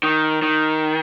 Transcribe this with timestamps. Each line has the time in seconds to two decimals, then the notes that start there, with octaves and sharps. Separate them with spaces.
0.03 D#3
0.42 D#3